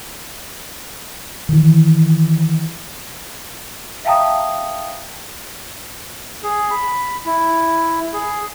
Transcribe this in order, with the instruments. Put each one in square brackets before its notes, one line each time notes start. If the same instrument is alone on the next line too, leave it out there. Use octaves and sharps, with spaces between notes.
[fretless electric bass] D#3 E3
[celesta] E5 F5 G5 A5 A#5 D#6
[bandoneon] G#4
B5
E4
G#4